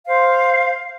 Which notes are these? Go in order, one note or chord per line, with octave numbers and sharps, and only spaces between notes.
C5 F5